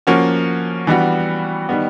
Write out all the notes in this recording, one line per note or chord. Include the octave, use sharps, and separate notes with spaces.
F3 A#3 C#4 F#4
E3 G3 B3 D4 F#4
D#3 G3 B3